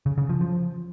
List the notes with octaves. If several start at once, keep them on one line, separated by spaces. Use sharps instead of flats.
C#3
C#3
F3
F3